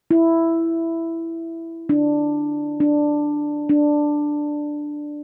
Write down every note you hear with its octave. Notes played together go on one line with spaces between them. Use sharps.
E4
D4
D4
D4